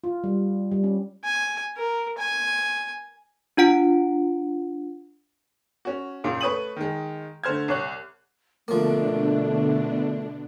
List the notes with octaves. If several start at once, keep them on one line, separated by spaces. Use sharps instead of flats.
F4
G3
G3
C#4
G#5
A#4
G#5
D4 F4 F#5 D7
C#4 F#4
C#2 F#2 A#2 C#3
A3 B4 C#5 D#6 D#7 F#7
D#3 G#3
D3 A3 C5 F6 G#6
C2 C#5 F#6
B2 D3 F3 A3 A#3 D4